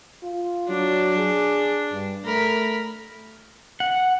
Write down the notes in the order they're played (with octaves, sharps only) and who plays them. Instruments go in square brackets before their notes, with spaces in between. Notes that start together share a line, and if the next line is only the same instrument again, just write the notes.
[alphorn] F4
[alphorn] F#3 [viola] D4
[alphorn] G#4
G2
[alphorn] A3 [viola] A#4 B5
[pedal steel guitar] F#5